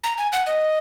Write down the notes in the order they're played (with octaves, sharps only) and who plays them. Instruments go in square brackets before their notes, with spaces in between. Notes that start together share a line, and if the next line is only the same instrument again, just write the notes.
[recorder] A#5
G#5
F#5
D#5